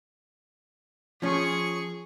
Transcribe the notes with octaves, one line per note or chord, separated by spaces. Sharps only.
F3 C#4 G#4 C#6